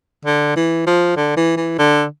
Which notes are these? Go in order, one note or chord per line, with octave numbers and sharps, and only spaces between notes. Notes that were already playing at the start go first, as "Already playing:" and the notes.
D3
E3
F3
D3
E3
E3
D3